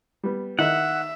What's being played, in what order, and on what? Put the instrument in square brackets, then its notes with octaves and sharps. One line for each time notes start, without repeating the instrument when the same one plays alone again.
[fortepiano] G3 B3
[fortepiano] D#3 D#5 F#6 [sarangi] E5 [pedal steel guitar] F#5